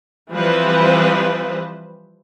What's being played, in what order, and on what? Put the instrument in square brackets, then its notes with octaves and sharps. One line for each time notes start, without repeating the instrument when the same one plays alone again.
[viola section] E3 F3 G3 C4 B4 C5